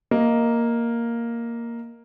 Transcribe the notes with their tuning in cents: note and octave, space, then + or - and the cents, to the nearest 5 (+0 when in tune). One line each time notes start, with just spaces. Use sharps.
A#3 +0 D#5 +10